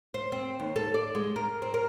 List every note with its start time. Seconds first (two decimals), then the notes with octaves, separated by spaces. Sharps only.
0.14 C5
0.32 C4
0.60 D#2
0.76 A4
0.94 D5
1.15 G#3
1.36 A#4
1.62 C4
1.74 A#4